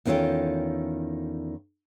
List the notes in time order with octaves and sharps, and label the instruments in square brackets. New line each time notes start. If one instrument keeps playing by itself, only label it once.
[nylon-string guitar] E2 D#3 C#4 F4 A4 G5